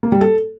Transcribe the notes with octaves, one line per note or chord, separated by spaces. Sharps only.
A#3
G3
A4